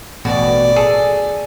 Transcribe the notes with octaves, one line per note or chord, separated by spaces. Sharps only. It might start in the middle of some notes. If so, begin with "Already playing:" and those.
A1 B2 F#4 D5
G#4 A4